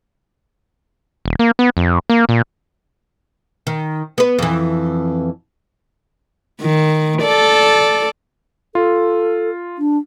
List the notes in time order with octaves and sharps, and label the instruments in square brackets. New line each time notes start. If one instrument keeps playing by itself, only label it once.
[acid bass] D#1
A#3
B3
F2
A#3
A#2
[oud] D#3
B3 B4
F2 E3
[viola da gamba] D#3
A4 D5
[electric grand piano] F4 [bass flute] A4
[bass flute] D4